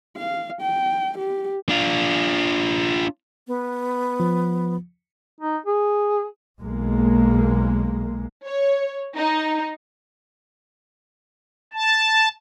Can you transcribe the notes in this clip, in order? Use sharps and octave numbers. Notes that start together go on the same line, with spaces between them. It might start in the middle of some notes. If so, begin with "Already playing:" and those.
F5
G5
G4
D4 F4
B3
F3
D#4
G#4
B1 G#3 A#3
C#5
D#4
A5